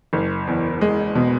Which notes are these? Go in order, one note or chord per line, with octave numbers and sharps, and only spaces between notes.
F#1
E2
G#3
B2